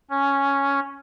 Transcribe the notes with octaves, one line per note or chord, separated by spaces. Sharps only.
C#4